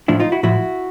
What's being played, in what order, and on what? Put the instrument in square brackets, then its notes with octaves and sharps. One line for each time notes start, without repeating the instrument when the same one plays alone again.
[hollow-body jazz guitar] A2 F3 D4 E4
D#4 F4
E4 F#4
A2 F3 E4 F#4